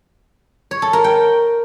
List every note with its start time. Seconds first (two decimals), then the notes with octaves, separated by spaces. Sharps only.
0.71 C#5
0.82 A4
0.93 A#4
1.04 G5